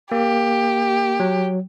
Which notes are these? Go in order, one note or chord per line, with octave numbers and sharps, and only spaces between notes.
A#3 G4
F#3